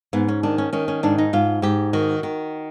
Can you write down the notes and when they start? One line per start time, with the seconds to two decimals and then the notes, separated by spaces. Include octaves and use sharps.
0.13 G#2 B3
0.28 C#4
0.43 D#3 D4
0.58 C#4
0.73 D#3 C#4
0.88 C#4
1.03 G#2 D4
1.18 D#4
1.33 G#2 F4
1.62 G#2 G4
1.93 D#3 F#4
2.23 D#3